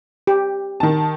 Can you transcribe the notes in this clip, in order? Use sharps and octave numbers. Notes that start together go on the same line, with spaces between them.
G4
D#3 A5